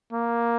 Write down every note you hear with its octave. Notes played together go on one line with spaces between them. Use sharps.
A#3